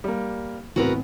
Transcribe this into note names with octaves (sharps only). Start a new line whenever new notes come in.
G3 A#3
C#2 A2 E3 B3 C4 F#4 A#4 B4